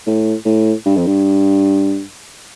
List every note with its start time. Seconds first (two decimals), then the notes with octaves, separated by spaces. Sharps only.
0.07 A2
0.45 A2
0.85 G2
0.97 F2
1.07 G2